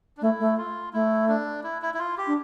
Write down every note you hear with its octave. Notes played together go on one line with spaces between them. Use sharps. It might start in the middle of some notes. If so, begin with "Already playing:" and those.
D4
A3 E4
A3
F4
A3 E4
D4
E4
E4
E4
F4
G4
D4